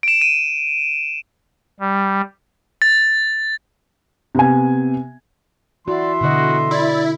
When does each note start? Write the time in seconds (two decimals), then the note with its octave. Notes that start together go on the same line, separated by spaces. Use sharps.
0.03 D7 E7
0.21 D#7
1.80 G3
2.82 A6
4.35 C3 B3 G#5
5.88 E3 F#4 D5 E5 C6
6.21 B2 D3 F#4 D#5
6.71 E4 D5